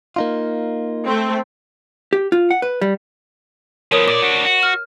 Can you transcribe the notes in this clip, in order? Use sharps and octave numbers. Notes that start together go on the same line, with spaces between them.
A#3 D#4 F4
A3 C4
G4
F4
F#5
B4
G3
F3 B3 A#4 C#5 D#6
A#2 D5 D6
D4 F#4
F#4
F6